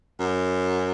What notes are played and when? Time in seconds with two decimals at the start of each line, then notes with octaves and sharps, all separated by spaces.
0.20 F#2